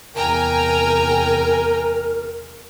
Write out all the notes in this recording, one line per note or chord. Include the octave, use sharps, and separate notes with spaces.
F1 E2 A#4 G5 G#5 A#5